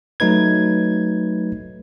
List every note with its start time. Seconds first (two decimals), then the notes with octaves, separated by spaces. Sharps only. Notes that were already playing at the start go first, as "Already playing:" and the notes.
0.20 F#3 A3 D#4 B4 G#6